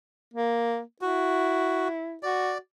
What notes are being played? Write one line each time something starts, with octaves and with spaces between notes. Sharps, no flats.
A#3
E4 F#4
F#4 D5